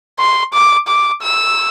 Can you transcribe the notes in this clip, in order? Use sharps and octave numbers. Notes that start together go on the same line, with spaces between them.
C6
D6
D6
E6